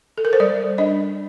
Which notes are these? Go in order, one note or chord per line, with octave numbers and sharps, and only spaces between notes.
A4
A#4
C5
G3 D5
D4 D#5